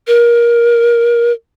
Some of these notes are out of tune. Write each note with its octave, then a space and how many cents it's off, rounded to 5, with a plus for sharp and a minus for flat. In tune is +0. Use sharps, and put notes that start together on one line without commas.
A#4 +20